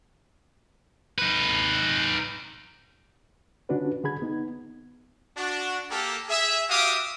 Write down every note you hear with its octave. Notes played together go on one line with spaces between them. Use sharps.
D#4 B4
D3 C#4 D4 F4 F#4 B4
D3 G#4 B5 G#6
B3 D#4
D4 F#4
A#3 G4 A4
G#4 E5
F#4 G4 E5 F5 D6 D#6